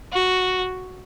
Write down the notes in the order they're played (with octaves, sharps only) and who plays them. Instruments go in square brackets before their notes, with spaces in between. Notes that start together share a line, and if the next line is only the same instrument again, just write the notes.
[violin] F#4